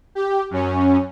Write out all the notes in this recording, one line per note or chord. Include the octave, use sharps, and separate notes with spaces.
G4
F#2 C#4